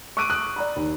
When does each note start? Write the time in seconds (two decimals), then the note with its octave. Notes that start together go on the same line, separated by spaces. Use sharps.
0.17 C#6 D6 E6 F#6 D7 D#7
0.30 D#6 F#6
0.56 D5 A#5 B5
0.76 D#2